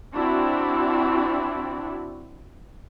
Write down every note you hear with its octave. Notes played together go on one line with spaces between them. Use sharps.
C4 D4 E4 F#4